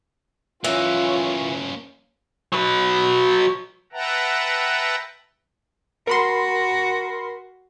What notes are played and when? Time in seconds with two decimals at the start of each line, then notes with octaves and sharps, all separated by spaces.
0.64 E3 A#3 C#4 F4 C#5
2.53 F#3 B4
3.93 B4 E5 F#5 G5 A5 A#5
6.07 F#4 A#4 B5 C6